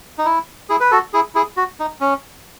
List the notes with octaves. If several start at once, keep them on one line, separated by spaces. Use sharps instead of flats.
D#4
E4
E4 G#4
B4
F#4 A4
E4 G#4
E4 G#4
F#4
D#4
C#4